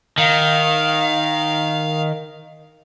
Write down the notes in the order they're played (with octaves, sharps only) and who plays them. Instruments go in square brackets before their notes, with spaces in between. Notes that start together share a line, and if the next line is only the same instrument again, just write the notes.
[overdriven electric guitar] D#3 [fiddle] F5